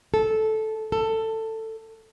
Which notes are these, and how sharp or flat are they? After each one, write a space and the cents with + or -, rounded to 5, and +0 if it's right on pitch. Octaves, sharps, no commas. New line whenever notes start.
A4 -10
A4 +15